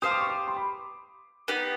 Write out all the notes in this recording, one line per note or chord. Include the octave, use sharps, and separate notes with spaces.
G4 C5 F5 A5 D#6
D6
C#6
D6
C6
B5
B3 D#4 G4